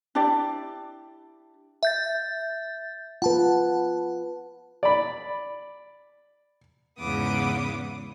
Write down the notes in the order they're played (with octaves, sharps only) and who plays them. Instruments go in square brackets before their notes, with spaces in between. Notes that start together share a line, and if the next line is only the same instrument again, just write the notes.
[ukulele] D4 E4 G4 D5
[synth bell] E5 G6 A6
[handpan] F4 B4 [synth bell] F#5 A5
[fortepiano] D5 B5
[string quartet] E2 G#2 C#3 B3 D6 D#6